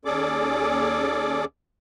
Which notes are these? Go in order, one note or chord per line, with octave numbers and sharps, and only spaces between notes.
D#2 C#4 G#4 A4 D5 D6